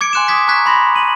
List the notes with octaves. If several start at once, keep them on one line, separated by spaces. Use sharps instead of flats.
D6 G#6 C#7 D7
G#5 C6 F#6 D7 E7
D6 D#6 G#6 B6
A#5 C#6 F#6 G#6 B6
B5 C6 A#6
C6 D#7 F#7